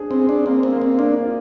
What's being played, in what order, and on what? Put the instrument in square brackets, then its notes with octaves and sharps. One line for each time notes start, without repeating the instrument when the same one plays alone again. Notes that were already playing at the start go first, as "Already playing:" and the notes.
Already playing: [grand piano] D4 G#4 C5
[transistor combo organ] C4
[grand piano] G#4
[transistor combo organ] D4
[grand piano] A#3 [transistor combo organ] C4
[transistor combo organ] C4
[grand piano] A#3
[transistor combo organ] C4
[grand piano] A#3 [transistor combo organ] D4
[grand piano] F4